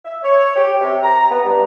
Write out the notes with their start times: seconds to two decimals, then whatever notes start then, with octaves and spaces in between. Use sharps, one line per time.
0.04 E5
0.23 C#5
0.55 G4
0.80 C3
1.03 A#5
1.29 B3
1.44 G2